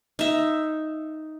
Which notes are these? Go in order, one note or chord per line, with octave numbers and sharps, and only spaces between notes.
D#4 E5